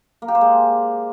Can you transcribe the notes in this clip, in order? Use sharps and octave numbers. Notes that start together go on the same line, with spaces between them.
A#3
G4
C5
G#3